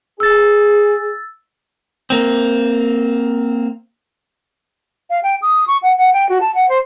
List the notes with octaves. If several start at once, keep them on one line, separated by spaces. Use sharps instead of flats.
G#4 E6 A6
A#3 C4
F5
G5
D#6
C#6
F#5
F#5
G5
F#4
A5
F#5
C5